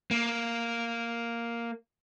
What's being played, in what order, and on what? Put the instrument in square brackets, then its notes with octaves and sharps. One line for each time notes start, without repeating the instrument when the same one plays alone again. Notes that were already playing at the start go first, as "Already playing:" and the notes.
[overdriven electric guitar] A#3